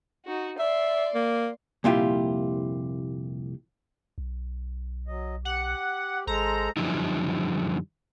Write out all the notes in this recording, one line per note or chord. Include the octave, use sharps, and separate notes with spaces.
D#4 F#4
D5 E5 C6
A#3
C2 F2 A#2 E4 F4 G4
B1
F#3 D#5
G4 F#5
G#1 G#3 A4 C5 A#5
F#2 D3 F3 G3 D#4 E4